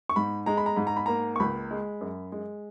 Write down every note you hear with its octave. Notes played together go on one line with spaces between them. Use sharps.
C#6
G#2 B5
G#3 A#5
B5
A#5
G#2 B5
A#5
B5
A#3 A#5
C#6
C#2 B5
G#3
F#2
G#3